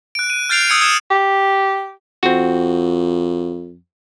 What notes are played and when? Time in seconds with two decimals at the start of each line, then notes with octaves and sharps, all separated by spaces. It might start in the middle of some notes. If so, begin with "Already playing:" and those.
0.15 F#6 D7
0.30 D#7
0.49 F6 G6 A6 C7 D7 F7
0.69 D#6 E6 G#6 C#7 F7
0.81 D#6 G#6 D#7 E7
1.11 G4
2.23 F2 C4 F#4